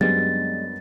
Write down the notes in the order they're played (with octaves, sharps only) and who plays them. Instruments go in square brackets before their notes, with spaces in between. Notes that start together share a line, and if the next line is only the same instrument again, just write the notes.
[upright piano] F#2 B3 D4 [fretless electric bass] G3 G#3 [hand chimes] A6